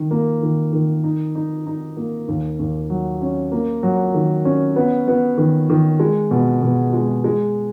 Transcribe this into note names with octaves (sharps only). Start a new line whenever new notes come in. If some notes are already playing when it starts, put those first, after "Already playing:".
Already playing: D#3
A#3
D#3
D#3
D#4
D#4
D#4
A#3
D#2
D#2
F#3
C#4
A#3
F#3
D#3
C#4
B3
B3
D#3
D#3
G#3
B2
B2
G#3
G#3